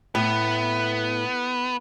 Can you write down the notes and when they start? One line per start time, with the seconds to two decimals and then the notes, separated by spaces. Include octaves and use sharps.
0.15 A2 B3